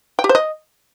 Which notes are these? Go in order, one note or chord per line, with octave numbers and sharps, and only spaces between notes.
G5
G4
C5
D#5